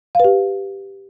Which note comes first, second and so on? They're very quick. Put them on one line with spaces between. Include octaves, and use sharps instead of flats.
F5 B4 G4